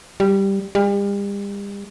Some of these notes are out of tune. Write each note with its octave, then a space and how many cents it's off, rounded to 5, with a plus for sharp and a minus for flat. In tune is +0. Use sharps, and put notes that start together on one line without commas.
G3 +0
G3 +40